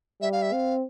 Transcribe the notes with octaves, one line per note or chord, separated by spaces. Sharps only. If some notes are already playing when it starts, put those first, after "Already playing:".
G3 E5
F5
E5
C4 F5